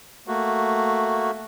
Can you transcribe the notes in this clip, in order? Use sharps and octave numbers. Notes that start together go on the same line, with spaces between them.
A3 A#3 F#4